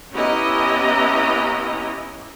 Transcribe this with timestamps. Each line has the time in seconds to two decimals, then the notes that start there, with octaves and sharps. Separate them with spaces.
0.13 B3 C#4 E4 G4 D#5 A#5